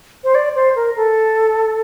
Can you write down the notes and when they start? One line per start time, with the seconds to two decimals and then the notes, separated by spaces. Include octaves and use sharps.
0.24 C5
0.35 D5
0.55 C5
0.76 A#4
0.96 A4